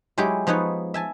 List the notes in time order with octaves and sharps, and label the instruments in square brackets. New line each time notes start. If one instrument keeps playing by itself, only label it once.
[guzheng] F#3 G#3 E4 G4 C#5
F3 B3 D#4 B4 C#5
E5 G#5 A5